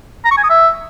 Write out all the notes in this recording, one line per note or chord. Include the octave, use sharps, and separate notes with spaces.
A#5
C#6
G#5
D#6
E5